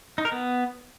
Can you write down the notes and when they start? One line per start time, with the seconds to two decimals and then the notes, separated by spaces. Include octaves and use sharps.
0.18 D#4
0.25 A#4
0.32 B3